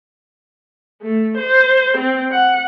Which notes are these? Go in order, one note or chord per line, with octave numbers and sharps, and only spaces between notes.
A3
C5
C4
F#5